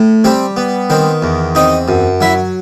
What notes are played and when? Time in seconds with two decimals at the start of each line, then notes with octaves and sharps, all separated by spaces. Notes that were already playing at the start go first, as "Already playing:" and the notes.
Already playing: A2
0.24 G3 C4 C5
0.57 B3
0.90 D#3 C4 C5
1.22 E2
1.55 C4 D#4 D#5
1.88 F#2
2.21 F#3 E4 E5